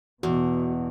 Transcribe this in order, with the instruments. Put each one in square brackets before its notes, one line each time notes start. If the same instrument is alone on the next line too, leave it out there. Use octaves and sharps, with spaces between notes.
[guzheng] E2 [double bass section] B2 [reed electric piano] F#4